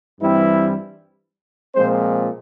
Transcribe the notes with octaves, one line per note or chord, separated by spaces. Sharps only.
G2 E3 G3 C4 E4
A#2 F3 G#3 C4 C5